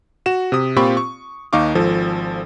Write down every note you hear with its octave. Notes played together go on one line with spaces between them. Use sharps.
F#4 E7
C3 D#6
A#2 C4 F4 G4 B5 C#6
C#6
D#2 D#4 F5 C#6 D6
G#1 F3 A4